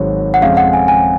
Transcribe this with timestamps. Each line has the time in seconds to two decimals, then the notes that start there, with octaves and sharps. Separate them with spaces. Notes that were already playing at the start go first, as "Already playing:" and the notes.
Already playing: G#1 G#2 F#3 C4 F#4 C#5
0.34 F#5
0.42 F2 C#3 G#3 C#4 F5
0.57 F#5
0.73 G#5
0.88 G#5